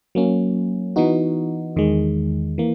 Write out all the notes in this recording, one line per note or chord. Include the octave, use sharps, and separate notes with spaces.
F#3 A#3 C#4
E3 B3 D#4 F#4
E2 D#3 G#3
E3 A#3